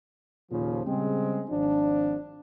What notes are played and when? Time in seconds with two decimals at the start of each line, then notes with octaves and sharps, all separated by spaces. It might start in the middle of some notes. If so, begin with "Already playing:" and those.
0.51 D#2 A#2 C#3 F3
0.86 C#3 G3 G#3 C4
1.50 G#1 F3 D4